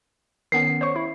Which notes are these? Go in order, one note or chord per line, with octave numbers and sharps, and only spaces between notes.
D#3 B3 C#4 C7
C5 C#5 C#6
E4